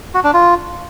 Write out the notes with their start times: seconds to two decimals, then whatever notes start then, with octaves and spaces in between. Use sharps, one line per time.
0.14 F#4
0.24 D4
0.34 F4